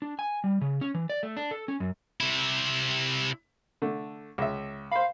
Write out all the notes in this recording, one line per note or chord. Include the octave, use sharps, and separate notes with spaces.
D4
G#5
G3
C#3
C#4
E3
D5
A3
D4
A4
C#4
F#2
C3 E4
D3 A3
C#2 E5
C5 F5 B5